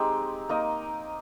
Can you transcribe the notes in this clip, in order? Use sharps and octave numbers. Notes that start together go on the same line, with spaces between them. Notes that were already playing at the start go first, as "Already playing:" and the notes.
Already playing: G#3 C4 D#4 G4
A#3 D#4 A#4 D#5